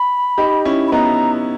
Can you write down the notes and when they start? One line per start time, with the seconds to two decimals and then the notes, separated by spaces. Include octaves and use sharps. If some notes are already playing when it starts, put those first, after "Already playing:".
Already playing: B5
0.38 D#4 G4
0.65 C#4 E4
0.88 B5
0.92 B3 D#4 A#5